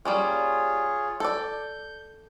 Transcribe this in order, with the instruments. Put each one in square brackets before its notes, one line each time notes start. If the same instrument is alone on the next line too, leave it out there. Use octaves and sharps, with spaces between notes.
[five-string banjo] G3 A#3 C#4 [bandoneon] F4 G#4 C#5
[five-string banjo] A4 D5 [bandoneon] G6